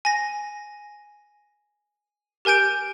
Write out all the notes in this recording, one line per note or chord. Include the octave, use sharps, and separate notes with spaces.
G#5 A#6
G4 A#4 G#5 G6 D7